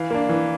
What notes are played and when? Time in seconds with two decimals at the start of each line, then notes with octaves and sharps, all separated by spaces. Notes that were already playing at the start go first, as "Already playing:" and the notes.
Already playing: E3 F5
0.11 A#3 D4
0.29 E3